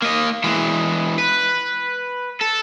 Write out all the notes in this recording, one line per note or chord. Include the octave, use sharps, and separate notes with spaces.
A#3 D#5
E3 G#3
B4
A4